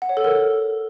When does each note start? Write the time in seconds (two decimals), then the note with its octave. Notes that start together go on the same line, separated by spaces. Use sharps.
0.02 F#5
0.09 C#5
0.17 A4
0.24 A#4